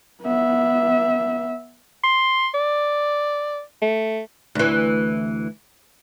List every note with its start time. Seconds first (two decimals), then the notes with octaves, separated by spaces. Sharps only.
0.22 B3 E5
2.04 C6
2.54 D5
3.82 A3
4.55 D2 E3